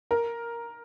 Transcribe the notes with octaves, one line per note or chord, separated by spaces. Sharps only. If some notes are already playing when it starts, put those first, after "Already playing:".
A#4